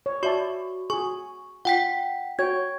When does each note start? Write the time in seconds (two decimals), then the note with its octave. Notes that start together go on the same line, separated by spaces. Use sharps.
0.06 C#5
0.23 F#4 D5 E5 A5 C#6
0.90 F#4 G#4 C#6
1.65 F4 F#5 G5 B6
2.39 F#4 C#5 G5 G#6